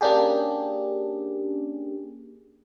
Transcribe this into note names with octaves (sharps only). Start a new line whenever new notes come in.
A#3 C#4 D4 G4 G#4